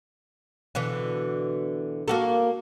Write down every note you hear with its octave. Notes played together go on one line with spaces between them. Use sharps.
B2 D3 E3
A#3 F#4 A4